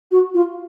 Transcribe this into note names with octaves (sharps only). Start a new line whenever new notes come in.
F#4
F4